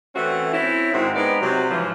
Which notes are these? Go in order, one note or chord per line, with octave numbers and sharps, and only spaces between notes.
E3 A3 C4 C#4 F#4
C4 C#4 E4
G#2 D#3 C4 E4 F#4
G#3 B3 C4 D#4 D5
C3 F#3
G#2 C#3 E3 F3